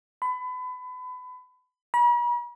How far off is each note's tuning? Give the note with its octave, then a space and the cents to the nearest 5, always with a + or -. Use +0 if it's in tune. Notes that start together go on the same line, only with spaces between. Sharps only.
B5 +30
B5 -45